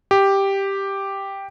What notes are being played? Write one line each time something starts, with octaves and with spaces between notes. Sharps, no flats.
G4